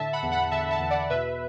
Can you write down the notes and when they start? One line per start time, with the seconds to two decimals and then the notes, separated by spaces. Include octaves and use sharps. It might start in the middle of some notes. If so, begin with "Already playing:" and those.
Already playing: A2 D3 E5 A5
0.13 F#5 B5
0.23 E2
0.32 F#5 B5
0.51 D3 E5 A5
0.71 E5 A5
0.81 E2
0.90 D5 F#5
1.10 B2 B4 E5